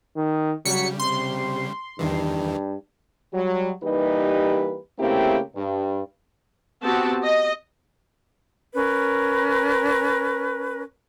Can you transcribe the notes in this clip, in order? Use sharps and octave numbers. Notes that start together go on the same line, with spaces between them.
D#3
C#3 F#3 G3 B6 C#7
C3 C6
E2 G2 D#3 E3
F#3 G3
E3 G3 A#3 D#4 G4 B4
C#3 A3 A#3 C4 E4 G4
G2
B3 C4 F#4 G4 A5
D#5
C#4 A#4 B4